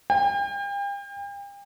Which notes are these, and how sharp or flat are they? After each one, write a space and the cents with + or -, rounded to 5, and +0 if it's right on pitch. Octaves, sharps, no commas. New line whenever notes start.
G5 +40